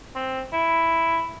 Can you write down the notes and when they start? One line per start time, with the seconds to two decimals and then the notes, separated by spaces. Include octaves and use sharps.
0.16 C4
0.53 E4